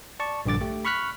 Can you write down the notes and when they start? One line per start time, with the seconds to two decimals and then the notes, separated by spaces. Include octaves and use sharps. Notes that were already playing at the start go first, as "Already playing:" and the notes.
0.20 D5 A5 C#6
0.46 A#1 G2 D3 D6 A6
0.61 A3 G4
0.85 B5 C#6 F6 F#6 B6